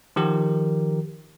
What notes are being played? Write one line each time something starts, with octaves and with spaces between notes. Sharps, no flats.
D#3 F3 G4 A#4